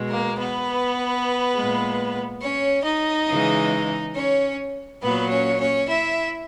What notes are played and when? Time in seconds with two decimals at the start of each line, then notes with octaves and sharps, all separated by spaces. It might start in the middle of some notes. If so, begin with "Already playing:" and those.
Already playing: B2 G#3
0.10 A#3 A#4
0.39 B3 B4
1.54 A#2 G#3
2.41 C#4 C#5
2.84 D#4 D#5
3.28 C#3 E3 G#3
4.14 C#4 C#5
5.01 A#2 F#3 B3 B4
5.30 C#4 C#5
5.59 C#4 C#5
5.88 E4 E5